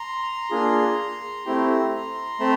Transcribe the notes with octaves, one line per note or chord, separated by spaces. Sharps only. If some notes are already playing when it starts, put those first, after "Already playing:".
Already playing: A#5 C6
A#3 D4 F4 G#4
A3 C4 E4 G4
A3 C4 A5 B5